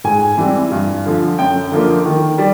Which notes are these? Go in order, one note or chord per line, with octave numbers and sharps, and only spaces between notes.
G#2 G#5
E3 G3 C4
G2
D3 F3
F#2 G5
D3 F3 A#3
D#3
G3